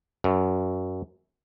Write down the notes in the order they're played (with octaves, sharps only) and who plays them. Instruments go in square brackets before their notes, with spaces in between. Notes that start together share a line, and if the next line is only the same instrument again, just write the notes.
[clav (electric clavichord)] F#2